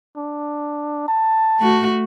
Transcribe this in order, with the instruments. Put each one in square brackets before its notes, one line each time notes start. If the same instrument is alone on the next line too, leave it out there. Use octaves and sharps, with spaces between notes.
[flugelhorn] D4
A5
[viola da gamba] A3 F#4